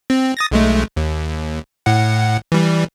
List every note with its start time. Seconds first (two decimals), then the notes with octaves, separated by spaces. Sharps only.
0.10 C4
0.37 D#6 A6 A#6
0.51 B1 G#3 A3
0.96 D#2
1.86 A2 F#5
2.52 E3 G3